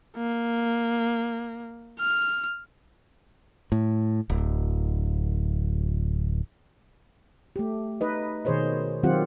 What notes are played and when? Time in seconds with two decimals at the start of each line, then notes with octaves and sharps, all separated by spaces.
0.17 A#3
1.99 F6
3.72 A2
4.30 D1
7.56 A3 G4
8.01 D#4 B4 D#5
8.45 B2 D#3 G#4 C5 C#5 D#5
9.03 D#3 F#3 C4 F4 G4 F#5